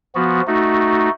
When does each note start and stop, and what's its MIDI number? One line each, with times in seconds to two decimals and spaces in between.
0.15 0.42 53
0.15 0.42 59
0.15 0.42 66
0.47 1.09 57
0.47 1.09 63
0.47 1.09 66